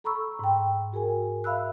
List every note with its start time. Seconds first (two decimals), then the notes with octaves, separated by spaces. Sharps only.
0.04 A4 A#5 B5 C#6 E6
0.39 G#2 G5
0.93 F#4 G#4 A#4 G#5
1.44 E5 F5 B5 E6 F#6